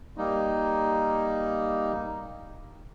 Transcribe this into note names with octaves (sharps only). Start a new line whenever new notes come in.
G3 A#3 D#4